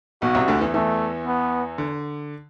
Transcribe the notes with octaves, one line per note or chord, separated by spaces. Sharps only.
B1 B2 F#4
C2 C3
D2 D3
E2 E3
E2 E3 A3
B3
D3